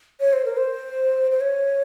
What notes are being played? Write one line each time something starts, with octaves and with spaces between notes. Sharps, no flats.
C#5
C5
A#4
C5
C5
C#5